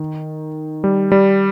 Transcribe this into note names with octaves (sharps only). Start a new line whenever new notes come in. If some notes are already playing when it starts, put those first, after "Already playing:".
Already playing: D#3
G3
G3